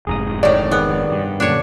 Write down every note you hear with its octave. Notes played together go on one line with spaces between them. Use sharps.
F1 F2 G#2 G#4 A#5 D#6
A2 D#3 C#5 D5
D#3 B3 G#4
G2
F#2 A#2 D3 D4 C#5